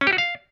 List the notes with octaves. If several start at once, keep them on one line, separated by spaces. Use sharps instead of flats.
C#4
G4
F#4
F5